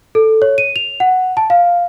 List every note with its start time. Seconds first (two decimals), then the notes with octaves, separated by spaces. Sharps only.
0.15 A4
0.42 C#5
0.58 D#7
0.76 F7
1.00 F#5
1.37 A5
1.50 F5